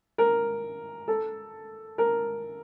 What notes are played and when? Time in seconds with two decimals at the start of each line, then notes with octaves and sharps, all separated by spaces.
0.18 A#4
1.08 A4
1.98 A#4